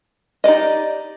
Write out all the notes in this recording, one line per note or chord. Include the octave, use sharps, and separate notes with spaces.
D#4 G4 D5 D#5